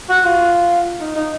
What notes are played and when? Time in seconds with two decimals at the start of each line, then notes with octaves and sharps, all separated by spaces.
0.09 F#4
0.25 F4
1.00 D#4
1.16 D#4